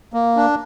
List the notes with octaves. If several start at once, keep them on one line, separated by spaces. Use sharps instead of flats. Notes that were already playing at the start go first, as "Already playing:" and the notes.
A#3
D4